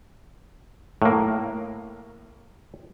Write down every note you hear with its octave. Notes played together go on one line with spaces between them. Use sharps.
A2 A#3